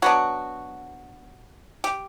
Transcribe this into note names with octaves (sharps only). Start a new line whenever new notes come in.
F#3 B3 D4 F#4
G4